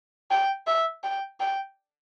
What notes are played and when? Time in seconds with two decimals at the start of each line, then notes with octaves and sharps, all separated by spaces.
0.31 G5
0.67 E5
1.04 G5
1.40 G5